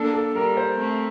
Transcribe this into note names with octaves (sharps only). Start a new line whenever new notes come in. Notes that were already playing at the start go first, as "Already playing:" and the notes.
Already playing: A#3 D4 A4
A4
G3 A#3 A#4
C5
A3 C4